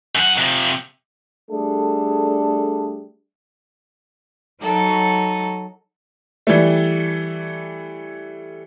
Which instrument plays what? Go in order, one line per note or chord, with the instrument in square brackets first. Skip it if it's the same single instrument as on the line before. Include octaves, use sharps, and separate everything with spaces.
[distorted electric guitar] F#2 F#5
C3 F3
[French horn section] G3 A3 D4 G#4 A4
[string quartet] F#3 D#4 A4
[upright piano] E3 G3 A3